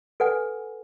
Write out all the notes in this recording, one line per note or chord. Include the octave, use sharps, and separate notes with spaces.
A4 B4 F#5 G#5